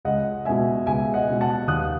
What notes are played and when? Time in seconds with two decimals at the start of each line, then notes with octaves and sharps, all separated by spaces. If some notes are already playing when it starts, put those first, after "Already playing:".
0.05 C#2 D#5 F#5
0.45 B2 G#3 E5 G#5
0.86 C#2 E5 G#5
1.14 D#5 F#5
1.28 B2 G#3
1.41 F#5 A5
1.68 D#2 D#6 F#6